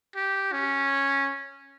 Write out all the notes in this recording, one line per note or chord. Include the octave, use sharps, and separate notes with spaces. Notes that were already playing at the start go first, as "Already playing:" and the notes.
G4
C#4